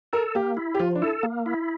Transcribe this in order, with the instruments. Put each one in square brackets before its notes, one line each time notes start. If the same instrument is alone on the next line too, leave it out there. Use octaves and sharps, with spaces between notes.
[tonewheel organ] A4 [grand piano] A#4
[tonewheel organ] A#3 [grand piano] G4
[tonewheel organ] E4
[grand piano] G4
[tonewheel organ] F3 [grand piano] F4
[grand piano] D4
[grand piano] E4 [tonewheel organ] A4
[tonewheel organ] A#3
E4